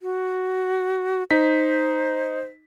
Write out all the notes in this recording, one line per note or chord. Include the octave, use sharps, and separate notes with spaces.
F#4
D#4 C5 B6